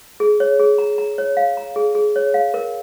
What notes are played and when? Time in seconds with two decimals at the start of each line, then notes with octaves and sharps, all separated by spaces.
0.20 G#4
0.40 C#5
0.59 G#4
0.78 A#5
0.98 A#5
1.18 C#5
1.37 F5
1.57 A#5
1.76 G#4
1.95 G#4
2.16 C#5
2.34 F5
2.54 A#4